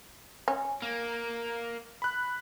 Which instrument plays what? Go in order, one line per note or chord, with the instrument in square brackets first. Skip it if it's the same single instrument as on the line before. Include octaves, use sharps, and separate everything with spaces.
[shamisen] C#4
[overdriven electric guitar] A#3
[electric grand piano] B5 F#6